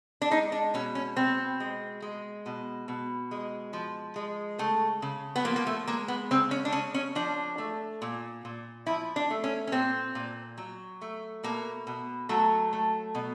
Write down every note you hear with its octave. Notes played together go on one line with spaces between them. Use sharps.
D4
G#3 D#4
D4
B2 C#4
C#4
B2 C4
G#3
G#3
B2
B2
G#3
F3
G#3
C#3 A3
C#3
B3
F3 A#3
A#3
A3
G#3 A#3
B3
C#3 C4
C#4
D4
C#3 C#4
C#4
F3 D4
A3
A#2
A#2
F3 E4
D4
A3
C#4
C#4
A#2 C4
A#2
F#3
A3
B2 A#3
B2
F#3 A3
A3
B2